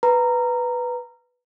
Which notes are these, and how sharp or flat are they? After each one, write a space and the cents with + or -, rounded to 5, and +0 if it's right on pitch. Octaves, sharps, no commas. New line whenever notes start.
B4 +0 A#5 -10